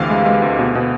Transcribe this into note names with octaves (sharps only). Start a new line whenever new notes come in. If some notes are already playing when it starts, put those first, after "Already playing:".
Already playing: D2 C3 E3 F5
G#3
G#3
D2
B2
B2